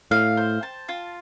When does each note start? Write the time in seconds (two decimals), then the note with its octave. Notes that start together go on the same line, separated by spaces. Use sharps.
0.11 A2 F5
0.37 C5
0.63 A5
0.89 F4